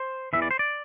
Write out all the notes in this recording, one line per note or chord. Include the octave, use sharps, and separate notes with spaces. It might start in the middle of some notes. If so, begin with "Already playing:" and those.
Already playing: C5
E2 C3 E3 E5
D5
C5
D5